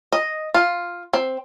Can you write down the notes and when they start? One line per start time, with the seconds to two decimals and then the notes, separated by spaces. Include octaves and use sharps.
0.12 D#5
0.54 F4
1.13 C4